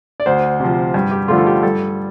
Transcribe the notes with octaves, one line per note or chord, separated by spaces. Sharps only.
D5
D2 C5
C3 F3
G2
G4
D3 F3 A3 F4
A4
G4
G2 A4